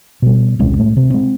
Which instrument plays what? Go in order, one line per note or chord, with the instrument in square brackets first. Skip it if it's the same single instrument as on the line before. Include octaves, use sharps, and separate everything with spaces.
[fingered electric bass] B2 G3
D#1 C2 G#3 C#4
A2 A3
C3
G#3 C4